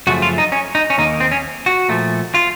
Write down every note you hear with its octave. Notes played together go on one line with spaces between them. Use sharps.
F#2 C#3 F3 A3 F#4
F4
D#4
C#4
D#4
C#4
D#2 D#3 A#3 D#4
C4
C#4
F#4
A#2 F3 A3
F4